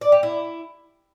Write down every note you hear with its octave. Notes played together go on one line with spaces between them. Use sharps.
D5
G4
E4